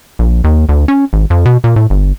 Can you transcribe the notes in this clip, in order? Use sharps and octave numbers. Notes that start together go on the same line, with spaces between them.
A#1
D#2
D2
C#4
G#1
F2
B2
A#2
A2
G1